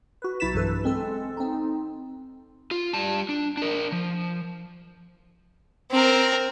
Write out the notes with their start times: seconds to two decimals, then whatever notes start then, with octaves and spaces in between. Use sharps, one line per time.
0.22 F#4 B4
0.40 B1 E4 A6 B6 E7
0.54 B1 G2 E3 A4 B4
0.84 G#3 C4 A4
1.37 C4 D#4
2.71 F4
2.93 G3 A5
3.29 D4
3.57 D4 A#4
3.92 F3
5.91 C4 A#4